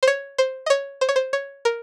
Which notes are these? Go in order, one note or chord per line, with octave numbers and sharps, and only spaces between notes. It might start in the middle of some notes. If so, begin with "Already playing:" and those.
C5
C#5
C5
D#5
C#5
C5
C#5
C5
C#5
A#4